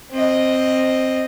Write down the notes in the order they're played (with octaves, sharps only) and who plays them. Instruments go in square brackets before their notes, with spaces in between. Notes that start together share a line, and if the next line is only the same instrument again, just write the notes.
[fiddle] C4 D#5